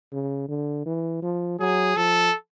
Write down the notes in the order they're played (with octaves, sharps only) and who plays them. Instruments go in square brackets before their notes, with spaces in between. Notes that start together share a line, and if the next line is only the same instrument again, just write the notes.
[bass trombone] C#3
D3
E3
F3
[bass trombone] F#3 [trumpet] G#4
[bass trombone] F3 [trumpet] A4